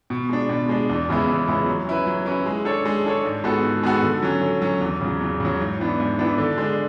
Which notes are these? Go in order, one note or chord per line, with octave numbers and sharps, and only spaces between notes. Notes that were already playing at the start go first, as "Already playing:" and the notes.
B2
G#3 D4
B2
G#3 D4
E2
C#3 G#3 B3 E4
E2
C#3 G#3 B3 E4
F#3
C#4 E4 B4
F#3
C#4 E4 B4
G#3
D4 A4 C#5
G#3
D4 A4 C#5
G#2
G#3 B3 F#4 A4
G#2
G#3 B3 F#4 A4
D3
F#3 C#4
D3
F#3 C#4
E2
C#3 F#3
E2
C#3 F#3
G#2
E3 B3 D4
G#2
E3 B3 D4
D3
G#3 D4